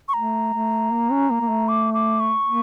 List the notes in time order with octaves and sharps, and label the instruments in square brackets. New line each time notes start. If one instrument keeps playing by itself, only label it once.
[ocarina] C#6
[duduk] A3 [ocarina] A#5
[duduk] A3
A#3
C#4
A#3
A#3
A3
[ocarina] D6
D6
C#6
[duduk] A#3